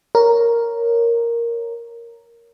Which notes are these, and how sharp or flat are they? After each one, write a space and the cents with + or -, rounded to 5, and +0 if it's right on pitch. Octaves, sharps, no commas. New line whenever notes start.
A#4 +0 C#5 +5